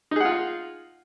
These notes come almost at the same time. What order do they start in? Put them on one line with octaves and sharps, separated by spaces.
D#4 G#4 F#5 F4